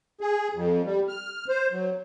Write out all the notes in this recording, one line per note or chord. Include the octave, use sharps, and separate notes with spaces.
G#4
F2
G3
F6
C5
F#3